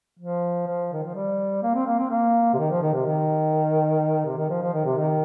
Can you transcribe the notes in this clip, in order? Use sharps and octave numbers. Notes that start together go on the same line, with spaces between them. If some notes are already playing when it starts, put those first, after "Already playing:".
F3
F3
D#3
F3
G3
A#3
C4
A#3
C4
A#3
C3
D#3
F3
D#3
C3
D#3
C3
D#3
F3
F3
D#3
C3
D#3